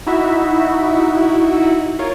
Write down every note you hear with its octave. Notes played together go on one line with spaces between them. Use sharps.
D#4 E4 F#4 E5
F4 A#4 C#5